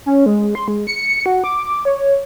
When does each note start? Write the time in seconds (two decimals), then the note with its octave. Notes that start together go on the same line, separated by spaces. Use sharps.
0.06 C#4
0.26 G#3
0.55 C6
0.68 G#3
0.87 C#7
1.26 F#4
1.44 D6
1.85 C#5